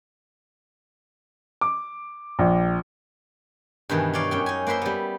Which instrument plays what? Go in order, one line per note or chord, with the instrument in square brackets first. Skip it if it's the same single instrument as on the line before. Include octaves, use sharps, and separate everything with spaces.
[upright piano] D6
A#1
[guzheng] G2 B2 D#3 E3
D#4 C#5 D5 F5
F#2 C#4 G5
D#4 G#5
A#3 B4 C5 E5 C6
G3 B3